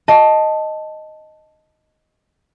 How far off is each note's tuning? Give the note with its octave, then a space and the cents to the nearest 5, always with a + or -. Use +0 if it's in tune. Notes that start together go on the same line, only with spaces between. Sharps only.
D#5 +0 A5 +0